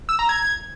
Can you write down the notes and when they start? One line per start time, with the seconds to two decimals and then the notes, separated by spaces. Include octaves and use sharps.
0.09 E6
0.19 A#5
0.29 G#6